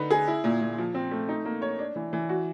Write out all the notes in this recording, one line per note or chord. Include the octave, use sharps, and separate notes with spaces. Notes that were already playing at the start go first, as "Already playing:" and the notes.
Already playing: D3 D#4 B4
G#4
E4
A#2
A#2
F3
C4
A3
D#4
A#3
C#5
D4
E3
E3
F#4